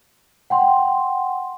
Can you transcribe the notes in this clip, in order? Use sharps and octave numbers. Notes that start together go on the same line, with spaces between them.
F#5 G5 C6